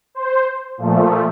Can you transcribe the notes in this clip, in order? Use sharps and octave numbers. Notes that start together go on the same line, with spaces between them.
C5
A#2 F3 A3